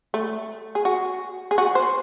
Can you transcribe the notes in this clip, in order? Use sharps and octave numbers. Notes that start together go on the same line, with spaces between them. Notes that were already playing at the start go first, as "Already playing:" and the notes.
A3
G#4
F#4
G#4
F#4
C5